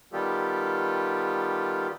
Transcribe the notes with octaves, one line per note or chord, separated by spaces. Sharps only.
D#3 G3 B3 F4 G4 A4